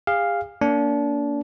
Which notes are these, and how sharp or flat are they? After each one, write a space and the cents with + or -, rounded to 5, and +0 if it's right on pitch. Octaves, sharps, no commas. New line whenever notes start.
G#4 -40 F5 +0
A#3 +0 D4 -30